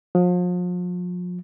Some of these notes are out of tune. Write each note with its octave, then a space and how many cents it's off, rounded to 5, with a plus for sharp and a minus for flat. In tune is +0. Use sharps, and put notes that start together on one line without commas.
F3 +40